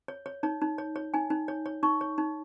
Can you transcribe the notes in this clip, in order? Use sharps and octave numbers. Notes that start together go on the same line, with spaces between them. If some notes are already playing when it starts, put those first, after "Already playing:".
C#5
C#5
D#4 C#5
D#4
C#5
C#5
D#4 G#5
D#4
C#5
C#5
D#4 C#6
C#5
D#4